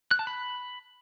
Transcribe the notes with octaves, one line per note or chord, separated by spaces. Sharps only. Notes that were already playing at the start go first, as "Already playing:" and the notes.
F#6
A5
B5